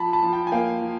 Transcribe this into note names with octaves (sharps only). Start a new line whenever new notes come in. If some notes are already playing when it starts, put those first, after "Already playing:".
Already playing: F3 A5 B5
A5 B5
F3
G5 A5
G#5
A#3 F5 G5
F3